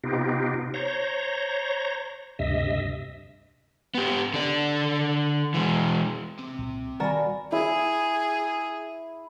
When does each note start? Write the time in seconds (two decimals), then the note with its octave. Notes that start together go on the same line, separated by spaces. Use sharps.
0.04 C3 B3 D#4 F4 G4
0.74 C5 C#5 A#5
2.39 D2 G2 C3 D#5 E5
3.95 B3 G4
4.34 D3 D5
5.54 E3 G#3
6.39 C3 C4
6.59 C2 A#2
7.00 D#3 G3 F#4 A#4 D5 G#5 A5 B5
7.52 E4 G#4